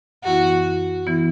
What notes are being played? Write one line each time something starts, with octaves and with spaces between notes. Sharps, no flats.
F#2 E3 B3 E4 F#4
E3 B3 E4